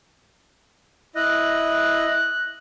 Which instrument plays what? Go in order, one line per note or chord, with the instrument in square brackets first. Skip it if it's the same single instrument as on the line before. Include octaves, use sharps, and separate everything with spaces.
[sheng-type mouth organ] E4 D#5 [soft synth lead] F#6